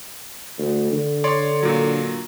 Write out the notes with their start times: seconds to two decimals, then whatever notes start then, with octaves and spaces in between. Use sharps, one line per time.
0.58 D2
0.92 D3
1.24 C#5 D5 C6
1.63 A#2 F#3